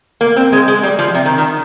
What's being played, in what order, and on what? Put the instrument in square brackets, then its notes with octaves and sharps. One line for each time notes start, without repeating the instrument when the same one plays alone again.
[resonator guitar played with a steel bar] A#3
C4
G#3
G#3
G3
F3
C3
D#3
D#3